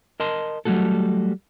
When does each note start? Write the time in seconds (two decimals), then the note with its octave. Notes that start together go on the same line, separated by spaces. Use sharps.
0.20 A#4 D#5 A5 C6
0.65 F#3 G3 A3 F#4 A4